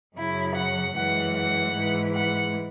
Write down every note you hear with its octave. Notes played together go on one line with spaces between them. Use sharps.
F#2 C#3 F#3 E4
F#5
F#2 E3 G#3 F#5
F#5
G#2 E3 G#3
F#5